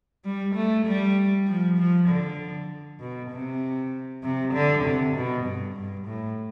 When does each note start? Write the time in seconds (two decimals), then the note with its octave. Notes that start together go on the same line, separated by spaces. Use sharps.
0.25 G3
0.55 A3
0.86 G3
1.47 F3
1.78 F3
2.08 D3
3.00 B2
3.31 C3
4.23 C3
4.53 D3
4.84 C3
5.15 B2
5.45 G2
5.75 G2
6.07 A2